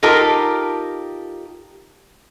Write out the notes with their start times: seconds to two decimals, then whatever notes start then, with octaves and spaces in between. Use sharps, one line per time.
0.03 D#4 F4 G4 A4 A#4